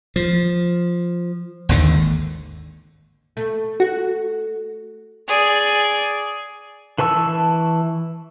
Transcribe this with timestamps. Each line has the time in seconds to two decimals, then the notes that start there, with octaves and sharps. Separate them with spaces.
0.16 F3
1.69 G#1 D#2 D3
3.37 A3
3.80 F#4
5.28 G#4 D5
6.98 E3 B4 A5 C#6 E6